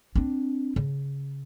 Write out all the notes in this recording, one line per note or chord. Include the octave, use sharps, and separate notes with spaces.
C4 D4
C#3